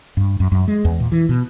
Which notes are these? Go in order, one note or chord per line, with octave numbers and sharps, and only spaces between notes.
G2
F#2
F#2
G#3
E2
A#2
E3
B2